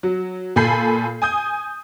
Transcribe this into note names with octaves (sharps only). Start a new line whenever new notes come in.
F#3
A#2 A4 G#5 B5 G6 C7
G#5 D#6 G6